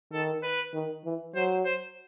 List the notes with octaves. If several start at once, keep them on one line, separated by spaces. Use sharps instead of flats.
D#3 A4
B4
D#3
E3
F#3 C5
C5